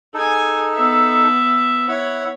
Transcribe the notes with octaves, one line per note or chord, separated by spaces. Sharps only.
D#4 G#4 A4 G#5
B3 E5
E4 C#5 F#5 B5